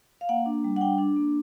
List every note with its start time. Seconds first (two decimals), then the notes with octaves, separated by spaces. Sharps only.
0.21 F5
0.29 A#3 F#5
0.46 D4
0.64 G3
0.76 F#5
0.81 D4 G5
0.98 D4
1.16 A#3